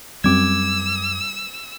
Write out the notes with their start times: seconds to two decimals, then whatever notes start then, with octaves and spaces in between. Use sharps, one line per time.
0.24 F#2 G3 C4 D6 E6 G#6